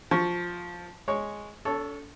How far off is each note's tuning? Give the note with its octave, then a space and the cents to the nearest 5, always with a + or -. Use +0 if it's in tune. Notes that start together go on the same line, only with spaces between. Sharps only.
F3 +10 C#6 +0
G#3 +0 C#5 +0
D4 -45 A4 +0 C#5 +0